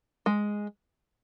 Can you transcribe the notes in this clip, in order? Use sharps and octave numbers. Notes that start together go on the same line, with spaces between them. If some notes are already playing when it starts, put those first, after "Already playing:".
G#3